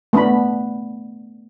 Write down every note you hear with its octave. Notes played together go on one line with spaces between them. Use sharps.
A3 B3 D4 B5